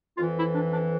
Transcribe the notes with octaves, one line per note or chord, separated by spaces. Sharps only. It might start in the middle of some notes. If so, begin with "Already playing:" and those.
F2 E3 F4
E4
D4
D4